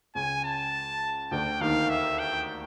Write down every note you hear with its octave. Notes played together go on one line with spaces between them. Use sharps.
C#2 C#3 G#5
A5
D2 D3 G5
D#2 D#3 F5
E5
G5